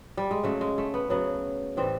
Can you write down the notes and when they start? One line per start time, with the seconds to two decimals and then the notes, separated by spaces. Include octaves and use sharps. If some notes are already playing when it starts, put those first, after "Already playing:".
0.17 G3
0.31 G#3
0.44 C#3 F#3 A3
0.61 G#3
0.78 A3
0.94 B3
1.10 C#3 F#3 B3
1.77 A2 E3 G3 C4